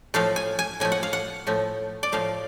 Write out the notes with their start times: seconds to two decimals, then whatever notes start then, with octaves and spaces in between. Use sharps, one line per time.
0.14 A2 F3 A3 F5
0.36 G#5
0.59 G#5
0.80 A2 F3 A3 G#5
0.92 F#5
1.03 F5
1.13 F#5
1.47 A2 F3 A3
2.03 D5
2.12 A2 F3 A3 F5